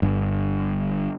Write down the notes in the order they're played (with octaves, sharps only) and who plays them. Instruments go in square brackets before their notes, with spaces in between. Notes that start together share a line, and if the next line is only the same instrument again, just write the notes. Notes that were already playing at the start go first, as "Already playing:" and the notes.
[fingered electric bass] G1 G2